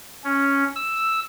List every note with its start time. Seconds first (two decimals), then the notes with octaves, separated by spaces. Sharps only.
0.24 C#4
0.76 E6